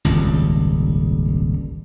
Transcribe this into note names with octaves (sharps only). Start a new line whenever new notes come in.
D#1 G#1 C#2